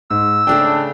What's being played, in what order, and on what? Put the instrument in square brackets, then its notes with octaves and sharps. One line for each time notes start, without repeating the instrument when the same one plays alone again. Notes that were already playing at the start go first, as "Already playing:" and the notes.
[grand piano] G#2 [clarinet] E6
[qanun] C#3 A3 C5 [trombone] D4 [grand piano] G5